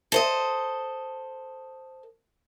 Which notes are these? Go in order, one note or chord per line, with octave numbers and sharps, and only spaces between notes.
A4 C5 D#5